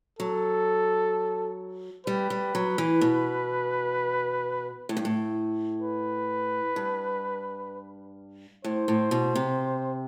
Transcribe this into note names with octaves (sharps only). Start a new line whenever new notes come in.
F#3 A4
G3 B4
G3
F#3
E3
B2
A2
G2
A2
B4
G2
A2 C5
A2
B2
C3